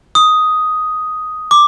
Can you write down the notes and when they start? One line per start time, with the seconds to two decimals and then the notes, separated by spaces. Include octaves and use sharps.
0.15 D#6
1.51 D6